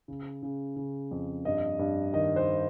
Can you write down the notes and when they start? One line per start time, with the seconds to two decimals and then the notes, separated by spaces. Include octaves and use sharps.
0.08 C#3
0.42 C#3
0.76 C#3
1.11 F2
1.45 G2 D#5
1.79 G2
2.13 D#3 D#5
2.36 C5